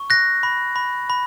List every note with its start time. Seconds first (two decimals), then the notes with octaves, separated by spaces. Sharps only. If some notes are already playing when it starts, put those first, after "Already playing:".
Already playing: C#6
0.10 F#6 A#6
0.43 B5
0.76 B5
1.10 B5